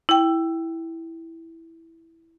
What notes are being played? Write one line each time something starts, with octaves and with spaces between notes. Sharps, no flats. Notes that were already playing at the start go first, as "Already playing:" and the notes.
E4 G5